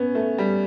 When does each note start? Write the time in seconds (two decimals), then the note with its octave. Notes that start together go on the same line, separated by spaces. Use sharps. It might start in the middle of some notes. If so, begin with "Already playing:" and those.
Already playing: B3 C#4
0.15 A3
0.38 G3